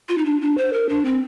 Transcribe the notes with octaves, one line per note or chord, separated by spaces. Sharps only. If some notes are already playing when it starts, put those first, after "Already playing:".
F4
D#4
D4
D4
C5
A#4
D4
C4